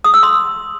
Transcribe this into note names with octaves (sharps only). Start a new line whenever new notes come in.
D#6
E6
C6